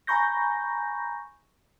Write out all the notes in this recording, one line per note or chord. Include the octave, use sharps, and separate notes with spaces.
G#5 A#5 B5 C#6 G6 A#6